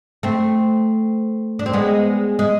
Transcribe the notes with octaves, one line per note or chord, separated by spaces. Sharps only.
A3 C4
D4
C4
G#3 B3
G#3